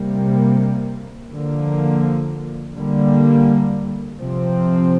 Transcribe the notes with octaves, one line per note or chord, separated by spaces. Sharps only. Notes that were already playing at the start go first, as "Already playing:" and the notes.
Already playing: C3 G3 A#3
D3 F3 A#3
D3 G3 A#3
C3 F3 C4